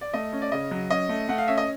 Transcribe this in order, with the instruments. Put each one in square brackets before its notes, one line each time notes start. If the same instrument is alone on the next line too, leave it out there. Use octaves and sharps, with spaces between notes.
[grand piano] D5
A3 D#5
C#4
D5
C#3 D#5
F#3
C#4 D#5
A3
A3 F#5
F5
C#4 E5
D#5